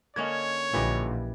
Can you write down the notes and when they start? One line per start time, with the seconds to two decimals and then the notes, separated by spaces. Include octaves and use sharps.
0.16 D3 A#3 C#4 C#5 D#5 G#6
0.73 A#1 A#2 D3 E3 G3 D#5